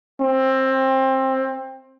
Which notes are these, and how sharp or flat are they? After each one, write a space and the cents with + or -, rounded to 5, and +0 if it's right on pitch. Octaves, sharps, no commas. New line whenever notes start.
C4 +20